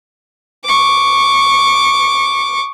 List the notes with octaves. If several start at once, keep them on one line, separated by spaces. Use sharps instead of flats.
C#6 D6